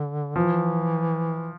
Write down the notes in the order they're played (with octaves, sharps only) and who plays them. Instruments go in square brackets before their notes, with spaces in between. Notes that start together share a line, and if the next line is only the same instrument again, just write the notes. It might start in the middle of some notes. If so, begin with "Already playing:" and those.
Already playing: [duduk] D3
[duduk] E3 [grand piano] F3